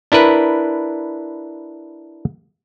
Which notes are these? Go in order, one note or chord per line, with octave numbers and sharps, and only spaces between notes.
D4 E4 A#4 B4